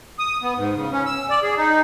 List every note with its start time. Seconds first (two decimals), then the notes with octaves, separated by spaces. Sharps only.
0.19 D#6
0.42 B3
0.57 G#2
0.75 C#3
0.92 C#4
1.06 E6
1.30 D5
1.42 G#4
1.58 D#4